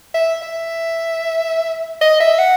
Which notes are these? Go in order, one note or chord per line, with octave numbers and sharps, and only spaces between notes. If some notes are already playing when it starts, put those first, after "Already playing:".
E5
E5
D#5
E5
F#5